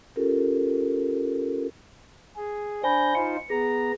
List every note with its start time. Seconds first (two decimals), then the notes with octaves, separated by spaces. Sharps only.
0.16 C#4 F4 G4 A4 A#4
2.36 G#4
2.83 D4 C5 G#5 B5 G6 A#6
3.15 D#4 F4 C5 C#7
3.50 B3 G#4 A#5